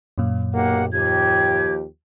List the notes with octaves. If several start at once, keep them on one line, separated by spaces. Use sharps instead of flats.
F#2 A#2
B1 A#3 G4 F#5
D#2 F3 G4 G#6